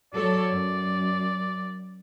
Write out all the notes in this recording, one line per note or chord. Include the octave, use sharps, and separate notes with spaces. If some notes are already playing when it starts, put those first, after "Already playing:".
F#3 A4 C#5 D5
F#2